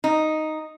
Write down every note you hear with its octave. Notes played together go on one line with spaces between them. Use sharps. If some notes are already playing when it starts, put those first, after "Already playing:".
D#4